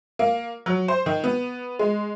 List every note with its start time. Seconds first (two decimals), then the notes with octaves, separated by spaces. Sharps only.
0.19 A#3
0.66 F#3
0.88 C5
1.06 D#3
1.24 B3
1.79 G#3